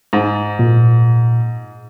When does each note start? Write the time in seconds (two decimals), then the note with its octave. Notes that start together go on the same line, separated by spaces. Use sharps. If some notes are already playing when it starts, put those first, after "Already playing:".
0.13 G#2
0.59 A#2